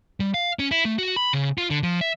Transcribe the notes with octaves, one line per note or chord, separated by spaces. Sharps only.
G3
F5
C#4
E4
A3
F#4
B5
C#3
F4
D3
F3
E5